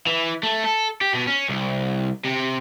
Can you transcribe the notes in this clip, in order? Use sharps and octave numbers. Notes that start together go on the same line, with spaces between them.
E3
A3
A4
G4
B2
C#4
C2
C3